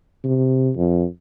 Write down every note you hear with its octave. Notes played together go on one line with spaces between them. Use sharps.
C3
F2